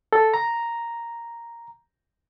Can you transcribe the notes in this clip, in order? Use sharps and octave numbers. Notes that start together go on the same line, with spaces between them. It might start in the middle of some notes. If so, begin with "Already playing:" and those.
A4
A#5